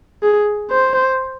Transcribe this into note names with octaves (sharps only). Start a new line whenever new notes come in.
G#4
C5